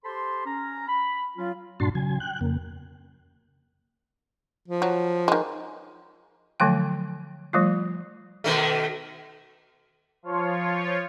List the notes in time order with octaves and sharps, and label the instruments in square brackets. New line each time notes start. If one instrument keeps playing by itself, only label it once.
[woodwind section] G4 A4 C5 A5 B5 C6
C#4 A#5
B5
F#3 C#4 F4
[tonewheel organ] G2 A#2 D4 F#4 A5 C6
C#3 F#3 G#5
G5 F#6
F2 C#3 A#3
[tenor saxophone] F3
[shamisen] F#3
D#3 G#3
[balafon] D3 F3 F#3 A3 G5
F3 G3 A3 F4
[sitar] B2 D#3 A3
[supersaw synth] F3 F4 C#5